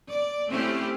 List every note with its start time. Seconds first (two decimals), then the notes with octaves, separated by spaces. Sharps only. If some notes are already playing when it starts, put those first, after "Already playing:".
0.11 D5
0.50 A3 C4 C#4 E4 G4